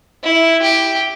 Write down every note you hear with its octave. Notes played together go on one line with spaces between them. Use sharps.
E4
G4